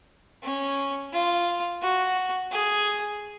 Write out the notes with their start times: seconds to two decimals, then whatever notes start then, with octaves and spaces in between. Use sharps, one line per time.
0.43 C#4
1.12 F4
1.82 F#4
2.51 G#4